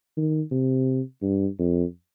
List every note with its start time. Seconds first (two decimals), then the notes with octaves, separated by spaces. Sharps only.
0.17 D#3
0.51 C3
1.22 G2
1.59 F2